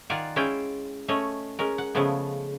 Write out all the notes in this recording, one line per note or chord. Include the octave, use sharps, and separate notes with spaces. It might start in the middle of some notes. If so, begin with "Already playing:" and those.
D#3 F4 D5 F#5 G#5
G#3 C#4 E4 F4 G5
A3 C#4 C#5 D#5
G#3 C#4 A#4
F#5
C#3 F3 G#3 A3 B3